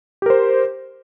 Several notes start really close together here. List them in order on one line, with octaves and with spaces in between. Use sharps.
G4 A#4 C5